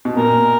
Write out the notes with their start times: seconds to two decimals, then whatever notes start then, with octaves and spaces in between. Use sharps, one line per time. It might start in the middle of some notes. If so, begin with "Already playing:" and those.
0.05 B2
0.17 A#2 A#4